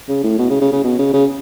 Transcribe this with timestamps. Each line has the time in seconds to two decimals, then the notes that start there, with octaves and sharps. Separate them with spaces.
0.09 C#3
0.23 A2
0.39 B2
0.50 C#3
0.61 C#3
0.72 C#3
0.84 B2
0.99 C#3
1.13 C#3